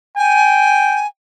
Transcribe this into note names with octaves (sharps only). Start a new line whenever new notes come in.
G5 G#5